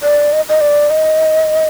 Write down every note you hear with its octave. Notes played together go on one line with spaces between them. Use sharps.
D5
D#5
D#5
D5
D#5